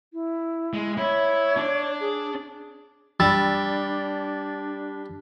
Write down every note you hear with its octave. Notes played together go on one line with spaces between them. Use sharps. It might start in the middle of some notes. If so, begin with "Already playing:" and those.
E4
G#3
E4 C#5
D4
G#4
G3 D4 B5 E6 A6